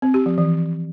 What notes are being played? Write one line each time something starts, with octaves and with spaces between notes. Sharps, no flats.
C4
G4
F3
E3